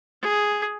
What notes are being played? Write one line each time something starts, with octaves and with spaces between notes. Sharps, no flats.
G#4